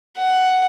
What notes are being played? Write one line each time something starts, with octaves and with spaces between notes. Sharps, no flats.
F#5